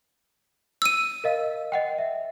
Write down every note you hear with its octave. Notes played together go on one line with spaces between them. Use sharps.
E6 D#7
A#4 D#5 F5
D#5 F#5 G5
E5